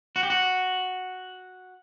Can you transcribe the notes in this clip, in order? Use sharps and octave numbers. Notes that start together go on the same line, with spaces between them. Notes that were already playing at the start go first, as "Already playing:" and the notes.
F#4
G4
F#4